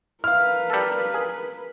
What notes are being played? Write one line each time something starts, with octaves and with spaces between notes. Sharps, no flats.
E4 A#4 B4 F5 F6
G3 A4
G#4